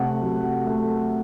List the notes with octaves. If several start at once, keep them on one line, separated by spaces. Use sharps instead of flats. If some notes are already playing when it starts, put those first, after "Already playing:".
Already playing: C3 A3 F#5
F#3
A3